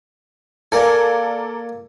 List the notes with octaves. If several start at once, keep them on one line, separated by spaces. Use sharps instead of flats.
A#3 A4 A#4 D5 G#5